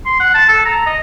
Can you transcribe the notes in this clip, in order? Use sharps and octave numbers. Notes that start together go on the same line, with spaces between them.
C6
F#5
A5
A4
A#5
D#5